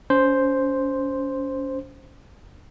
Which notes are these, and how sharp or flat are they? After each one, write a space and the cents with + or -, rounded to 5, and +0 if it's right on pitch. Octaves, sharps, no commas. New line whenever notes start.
C#4 +30 C5 +0